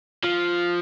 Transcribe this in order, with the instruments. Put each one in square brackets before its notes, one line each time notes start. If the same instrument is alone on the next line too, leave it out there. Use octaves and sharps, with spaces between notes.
[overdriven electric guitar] F3